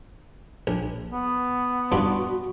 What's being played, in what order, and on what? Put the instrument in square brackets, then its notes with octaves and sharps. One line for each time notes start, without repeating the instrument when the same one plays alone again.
[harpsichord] A#1
[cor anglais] B3
[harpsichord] G2 D4 F4 [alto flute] F#4